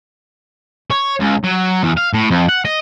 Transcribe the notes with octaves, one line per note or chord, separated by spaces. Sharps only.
C#5
C#2
F#3
E2
F5
A2
F2
F#5
D#5